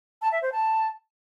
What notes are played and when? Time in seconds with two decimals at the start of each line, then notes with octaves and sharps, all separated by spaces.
0.22 A5
0.32 E5
0.42 C5
0.52 A5